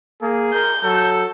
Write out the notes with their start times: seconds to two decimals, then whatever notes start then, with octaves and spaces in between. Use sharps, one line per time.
0.22 A#3 G#4
0.54 A#4 G6
0.83 F#3 A4